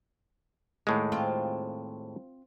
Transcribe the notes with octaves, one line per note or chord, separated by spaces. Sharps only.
D#2 A2 G#3 A#3
C4 F4